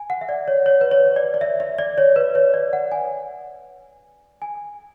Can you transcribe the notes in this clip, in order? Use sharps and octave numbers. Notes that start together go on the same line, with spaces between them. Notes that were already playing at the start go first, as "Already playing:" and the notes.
Already playing: G#5
F#5
E5
D5
C#5
C#5
B4
C#5
D5
D5
E5
E5
D5
C#5
B4
C#5
D5
F#5
G#5
G#5